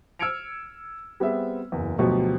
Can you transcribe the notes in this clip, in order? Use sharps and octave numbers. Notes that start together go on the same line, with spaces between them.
E6 F6 G#6 C#7 D7 F7
G3 B3 C4 G#4 E5
F#1 E2
D2 B2 F3 F#3 G4 C#6